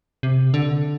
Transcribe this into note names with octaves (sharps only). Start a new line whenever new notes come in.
C3
D3